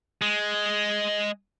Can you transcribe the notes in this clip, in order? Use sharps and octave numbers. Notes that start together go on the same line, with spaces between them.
G#3